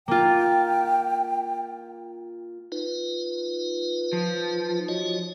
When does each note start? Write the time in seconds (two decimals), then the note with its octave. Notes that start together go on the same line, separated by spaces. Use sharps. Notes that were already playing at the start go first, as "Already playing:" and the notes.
0.08 A#3 F4 G5
2.72 D#4 F4 B4
4.13 F3
4.88 F#4 C#5 D#5